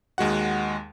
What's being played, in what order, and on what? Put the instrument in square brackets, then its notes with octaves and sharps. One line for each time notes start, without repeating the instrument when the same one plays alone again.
[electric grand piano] D#2 G#3 F#4 F#5